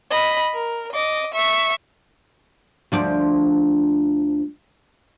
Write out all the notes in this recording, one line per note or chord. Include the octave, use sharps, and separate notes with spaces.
D#5 B5
A#4
D#5 D6
E5 C#6
D2 F3 D5